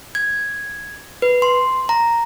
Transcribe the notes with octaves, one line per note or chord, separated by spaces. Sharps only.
G#6
B4
C6
A#5